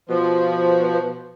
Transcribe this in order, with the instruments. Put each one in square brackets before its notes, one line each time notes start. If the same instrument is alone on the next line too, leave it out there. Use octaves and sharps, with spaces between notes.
[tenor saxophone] B2 [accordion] F3